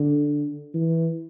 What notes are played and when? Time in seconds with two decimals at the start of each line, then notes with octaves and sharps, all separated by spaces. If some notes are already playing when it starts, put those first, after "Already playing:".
Already playing: D3
0.74 E3